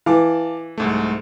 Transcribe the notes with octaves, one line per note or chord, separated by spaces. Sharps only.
E3 F5 A5 D6
C2 G#2 A3